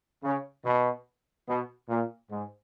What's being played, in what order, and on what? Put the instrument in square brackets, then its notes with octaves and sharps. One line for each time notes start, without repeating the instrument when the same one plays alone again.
[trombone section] C#3
B2
B2
A#2
G#2